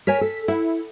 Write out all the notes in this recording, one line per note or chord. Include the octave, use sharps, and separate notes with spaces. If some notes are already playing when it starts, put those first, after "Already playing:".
A#4 C#5 G#5 B6
A4
E4 F#5